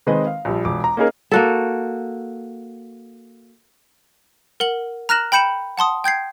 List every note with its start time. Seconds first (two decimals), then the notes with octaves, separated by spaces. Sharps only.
0.07 D#3 G#3 C4 B4 D#5
0.27 F5
0.45 A#1 G3
0.65 E1 D6
0.84 A#5
0.97 A#3 C#4 D#4 G#4 A#4
1.31 A#3 F#4 A4
4.60 A#4 F#5 F#7
5.09 A#5 F6 F#6 A#6 E7 F#7
5.32 G5 B5 G6 C#7 E7 F#7
5.78 F#5 A5 C6 D#6
6.04 G5 G6 G#6 C7